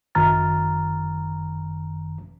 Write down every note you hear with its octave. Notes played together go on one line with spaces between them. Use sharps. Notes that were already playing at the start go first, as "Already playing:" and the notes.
G1 F#2 D#3 A#5 F6 A6